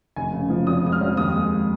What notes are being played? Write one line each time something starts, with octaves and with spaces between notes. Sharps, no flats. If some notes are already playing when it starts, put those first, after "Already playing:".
F1 G#5
C#3
F3
F2 D#6
G#3 D#6
F6
F2
D#2 D#6
G#3